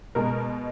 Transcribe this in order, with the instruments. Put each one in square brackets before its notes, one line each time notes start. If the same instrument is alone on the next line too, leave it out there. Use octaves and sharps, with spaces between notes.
[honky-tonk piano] B2 G#3 A#4